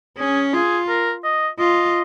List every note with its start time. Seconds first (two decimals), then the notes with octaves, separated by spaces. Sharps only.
0.18 C#4 G#4
0.54 F4 G#4
0.89 A#4
1.24 D#5
1.59 F4 D#5